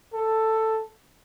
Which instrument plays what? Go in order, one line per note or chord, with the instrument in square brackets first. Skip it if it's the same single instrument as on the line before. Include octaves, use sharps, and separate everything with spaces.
[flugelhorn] A4